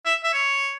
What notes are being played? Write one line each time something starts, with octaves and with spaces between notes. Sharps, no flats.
E5
E5
C#5